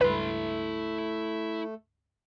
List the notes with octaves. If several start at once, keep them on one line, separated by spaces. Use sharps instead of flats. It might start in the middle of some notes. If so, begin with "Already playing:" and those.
C#2 G2 A3 E4 B4 C6